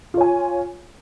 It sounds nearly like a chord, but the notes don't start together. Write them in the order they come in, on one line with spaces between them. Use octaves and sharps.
F4 C#5 G#5